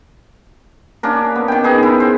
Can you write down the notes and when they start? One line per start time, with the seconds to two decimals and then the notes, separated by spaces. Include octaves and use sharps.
1.03 A#3 C#4 D4 A#4
1.36 B3
1.48 D#3 G5
1.64 D#4 G#4 B4
1.83 E4
2.00 C5